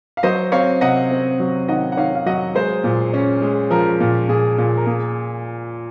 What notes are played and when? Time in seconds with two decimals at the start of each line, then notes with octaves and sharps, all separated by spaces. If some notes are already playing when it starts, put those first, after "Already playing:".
0.17 F5
0.23 F#3 C5 D#5
0.52 C4 C#5 F5
0.81 C3 D#5 F#5
1.11 C4
1.40 F#3
1.68 D#3 D#5 F#5
1.92 F#5
1.97 D#3 C#5 F5
2.15 F5
2.26 F#3 D#5 F#5
2.55 G#3 G#4 C5
2.84 A#2
3.14 C#4
3.42 G#3
3.71 F3 A#4
4.00 A#2
4.29 A#2 G#4
4.58 A#2
4.77 A#4
4.86 A#3 G#4